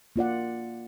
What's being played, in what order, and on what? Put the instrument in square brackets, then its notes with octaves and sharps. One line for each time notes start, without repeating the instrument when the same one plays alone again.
[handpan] A#3 F4 D5 F#5